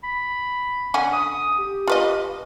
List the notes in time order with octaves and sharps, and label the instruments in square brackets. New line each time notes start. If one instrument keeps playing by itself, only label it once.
[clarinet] B5
[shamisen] D3 C#4 F#5
[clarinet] D#6
G4
[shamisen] F4 B4 D#5